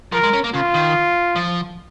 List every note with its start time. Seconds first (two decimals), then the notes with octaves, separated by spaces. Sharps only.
0.12 F3 A#4
0.23 G#3
0.33 C#4
0.44 A#3
0.54 C#3 F4
0.74 D#3
1.36 F3